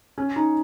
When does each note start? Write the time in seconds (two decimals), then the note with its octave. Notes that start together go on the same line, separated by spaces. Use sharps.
0.18 C#4
0.36 D#4